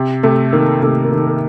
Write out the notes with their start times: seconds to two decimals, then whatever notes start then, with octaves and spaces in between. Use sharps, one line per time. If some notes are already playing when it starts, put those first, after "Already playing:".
Already playing: C3
0.23 C3 A3
0.53 D#3 A#3
0.82 C3 A3
1.05 A#3
1.12 D#3
1.27 A#3